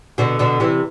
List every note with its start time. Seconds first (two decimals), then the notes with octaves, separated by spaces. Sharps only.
0.18 B2 D3
0.39 B2 D3
0.60 C3 E3